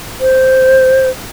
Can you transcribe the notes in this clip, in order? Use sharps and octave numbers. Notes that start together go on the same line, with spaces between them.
C5